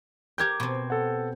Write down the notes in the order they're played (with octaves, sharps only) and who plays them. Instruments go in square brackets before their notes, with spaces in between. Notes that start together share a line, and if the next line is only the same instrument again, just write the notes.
[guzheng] G4 A#4 G5 [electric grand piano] G6 G#6
[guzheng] B2 C4
[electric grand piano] A4 F#5